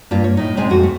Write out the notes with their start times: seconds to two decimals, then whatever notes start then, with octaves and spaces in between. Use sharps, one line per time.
0.11 G2 A#3 F4
0.24 C#5
0.37 A2 D#4
0.57 C3 G#3 C4 G#5
0.70 F2 F#4
0.83 A3